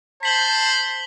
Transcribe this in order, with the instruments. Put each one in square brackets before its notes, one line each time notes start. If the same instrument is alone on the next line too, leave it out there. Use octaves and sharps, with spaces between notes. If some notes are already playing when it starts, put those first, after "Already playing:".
[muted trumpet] C5 [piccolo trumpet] A5 [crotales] B6 F#7 G7